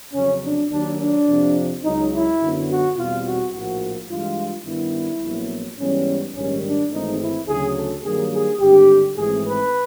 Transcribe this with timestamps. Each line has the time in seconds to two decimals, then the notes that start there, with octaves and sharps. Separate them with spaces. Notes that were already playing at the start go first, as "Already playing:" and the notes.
0.14 F2 C#3 F#3 C#4
0.43 D4
0.71 D#2 D#3 F#3 D4
0.99 D4
1.27 F2 C3 F3
1.83 C#2 C#3 F#3 D#4
2.12 E4
2.41 F#2 D3 F#3 B3
2.68 F#4
2.97 E2 B2 G3 C4 F4
3.25 F#4
3.52 A#1 A2 F3 A#3 F#4
4.08 G2 E3 G#3 F4
4.65 G2 D#3 G3 B3 E4
5.22 A#1 A#2 F#3 B3
5.79 G#2 E3 G3 B3 C#4
6.34 A#1 G#2 D#3 G3 C#4
6.63 D4
6.91 G#1 G#2 E3 A3 C4 D#4
7.20 E4
7.48 D2 C#3 F#3 G#4
7.75 A4
8.03 G2 D#3 F#3 A#3 G#4
8.32 G#4
8.60 G#1 G2 D3 G4
9.16 G#1 G#2 E3 A3 C4 G#4
9.45 B4